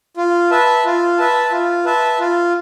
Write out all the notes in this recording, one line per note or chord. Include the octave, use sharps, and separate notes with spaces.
F4
B4 E5 A5
F4
B4 E5 A5
F4
B4 E5 A5
F4